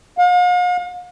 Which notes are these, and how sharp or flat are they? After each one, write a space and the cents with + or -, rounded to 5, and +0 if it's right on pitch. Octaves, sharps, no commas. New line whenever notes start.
F5 +45